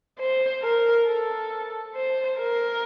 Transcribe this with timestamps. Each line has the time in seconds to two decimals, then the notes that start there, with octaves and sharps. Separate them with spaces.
0.19 C5
0.63 A#4
1.07 A4
1.96 C5
2.39 A#4